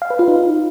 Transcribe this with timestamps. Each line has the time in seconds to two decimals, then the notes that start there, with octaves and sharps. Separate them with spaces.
0.02 F5
0.10 B4
0.19 F4
0.28 D#4